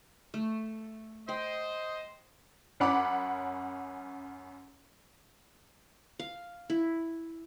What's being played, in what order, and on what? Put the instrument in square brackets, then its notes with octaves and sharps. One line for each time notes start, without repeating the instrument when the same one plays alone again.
[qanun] A3
[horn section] C5 D#5 [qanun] G5
[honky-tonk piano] F#2 C#4 F#5 B5 D6
[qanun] F5
E4